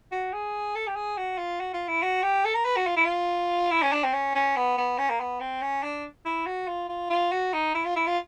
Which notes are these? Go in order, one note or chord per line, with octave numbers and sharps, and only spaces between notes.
F#4
G#4
A4
G4
G#4
F#4
F4
F#4
F4
E4
F#4
G4
A4
A#4
B4
F#4
F4
E4
F4
E4
C#4
D4
C4
C#4
C#4
B3
B3
C#4
A#3
B3
C4
C#4
D4
E4
F#4
F4
F4
F4
F#4
D#4
E4
F4
E4
F4